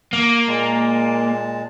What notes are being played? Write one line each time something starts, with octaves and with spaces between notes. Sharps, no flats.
A#3
A#2 G#3 A5